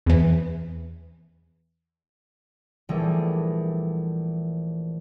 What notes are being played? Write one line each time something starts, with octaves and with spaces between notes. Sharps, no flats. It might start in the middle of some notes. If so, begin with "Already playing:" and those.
E2 E3
A#1 E3 G3 A3 G#4